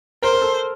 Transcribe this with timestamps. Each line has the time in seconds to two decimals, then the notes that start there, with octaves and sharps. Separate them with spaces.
0.22 A#4 C5
0.33 A#4
0.41 A4